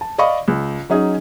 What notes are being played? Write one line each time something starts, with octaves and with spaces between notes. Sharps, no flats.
A5
D5 D#5 F5 B5 C#6 D#6
C#2
F#3 C#4 D#4 G#4